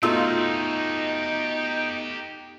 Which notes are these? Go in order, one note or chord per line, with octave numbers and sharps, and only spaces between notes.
B2 A3 D#4 F4 G4 F5 E6